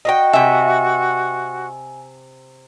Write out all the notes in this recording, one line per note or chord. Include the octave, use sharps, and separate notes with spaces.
F#4 D#5 F5 G5
C3 E5 G#5